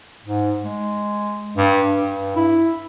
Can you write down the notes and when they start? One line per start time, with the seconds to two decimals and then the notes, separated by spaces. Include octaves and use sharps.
0.24 G#2
0.64 G#3
1.57 G2
1.92 G2
2.36 E4